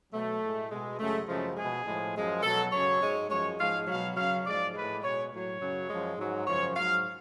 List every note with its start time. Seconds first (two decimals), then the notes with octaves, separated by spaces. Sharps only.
0.12 B2 F#3 A3
0.42 A2 G#3
0.70 B2 G#3
0.99 F#2 C#3 G#3 A3
1.28 F#2 C#3 F3 G#3 A3
1.57 B2 G#3 G#4
1.86 A2 F3 G#3
2.15 F#2 F3 G#3
2.43 B2 F#3 A4
2.72 F#2 C#3 F#3 C#5
3.01 G#2 G#3
3.30 F#2 F3 G#3 C#5
3.59 G#2 F3 G#3 F5
3.87 B2 F#3 F5
4.16 F#2 C#3 F#3 F5
4.45 G#2 F3 G#3 D5
4.74 A2 G#3 B4
5.03 B2 G#3 C#5
5.32 A2 F#3 C#5
5.60 F#2 C#3 F#3
5.90 F#2 F3 G#3
6.18 G#2 F#3
6.47 F#2 C#3 F3 C#5
6.76 G#2 F#3 F5